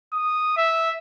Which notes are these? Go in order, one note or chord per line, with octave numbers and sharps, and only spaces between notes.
D#6
E5